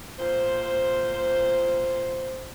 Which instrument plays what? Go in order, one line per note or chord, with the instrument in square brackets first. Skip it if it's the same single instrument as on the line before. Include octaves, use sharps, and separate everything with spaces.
[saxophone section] A#2 C5